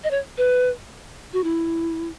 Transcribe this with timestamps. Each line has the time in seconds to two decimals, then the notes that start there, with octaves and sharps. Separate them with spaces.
0.04 D#5
0.11 C#5
0.38 B4
1.33 F#4
1.44 E4